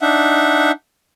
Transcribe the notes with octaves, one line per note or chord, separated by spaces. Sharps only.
D4 D#4 E5 F#5